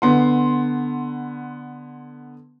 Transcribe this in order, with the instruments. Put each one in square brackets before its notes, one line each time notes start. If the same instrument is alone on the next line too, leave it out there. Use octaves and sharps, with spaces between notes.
[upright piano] D3 B3 C6